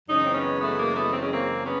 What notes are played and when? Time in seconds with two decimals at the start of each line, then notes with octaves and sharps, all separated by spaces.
0.08 F#2 C#3 E3 G#3 C#4 D#4
0.25 C4
0.34 B3 C#4
0.60 A3 B3
0.78 A#3
0.94 A3 B3
1.12 C4
1.21 C#4
1.31 A#3 C4
1.64 B3 C#4